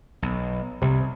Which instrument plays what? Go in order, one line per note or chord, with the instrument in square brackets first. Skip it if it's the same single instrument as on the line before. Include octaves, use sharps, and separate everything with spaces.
[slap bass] B1
[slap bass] C2 [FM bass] C3